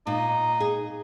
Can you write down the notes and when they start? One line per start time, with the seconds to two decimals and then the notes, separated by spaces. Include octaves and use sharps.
0.07 A#2 D#4
0.60 G#4